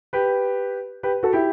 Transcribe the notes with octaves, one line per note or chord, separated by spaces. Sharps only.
G4 B4
G4 B4
F#4 A4
E4 G4